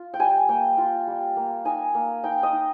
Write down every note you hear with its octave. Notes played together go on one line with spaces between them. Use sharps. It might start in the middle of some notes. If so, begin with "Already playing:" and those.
Already playing: F4
G5
G3 G#5
A#3 G5
F4
G3
A#3
D#4 G#5
A#3
D#4 G5
D#5
D#4